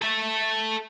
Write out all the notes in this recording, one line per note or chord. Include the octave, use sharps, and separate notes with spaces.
A4 E5